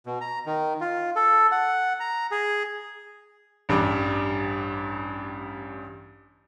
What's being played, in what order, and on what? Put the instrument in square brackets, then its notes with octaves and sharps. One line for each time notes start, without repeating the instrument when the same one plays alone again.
[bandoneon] B2
A#5
D#3
F4
A4
F#5
A#5
G#4
[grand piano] A1 G2 G3